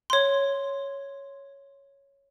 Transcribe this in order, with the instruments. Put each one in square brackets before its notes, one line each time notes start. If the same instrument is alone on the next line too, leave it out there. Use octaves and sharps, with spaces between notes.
[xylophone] C#5 C6